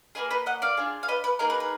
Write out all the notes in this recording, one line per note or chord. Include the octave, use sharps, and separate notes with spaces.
A#3 F4 G#4 B4 D#5
B4 D#5
D#5 F#5
D5 F5
D4 F4 G#4
F5
B4 D#5
B4
A#3 D#4 G#4 A#4
B4
B4